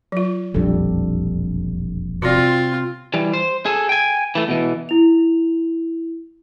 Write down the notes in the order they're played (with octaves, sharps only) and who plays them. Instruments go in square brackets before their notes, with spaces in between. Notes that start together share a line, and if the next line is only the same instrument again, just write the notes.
[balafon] F#3 F4
[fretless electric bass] E1 A#1 F2 [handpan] G3 D4 A4
[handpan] C3 [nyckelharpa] C4 F4 [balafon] F#4 D5
[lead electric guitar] E3 G3
C5
G#4 A4
G5 G#5
E3 A3
B2 E3
[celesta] E4 F7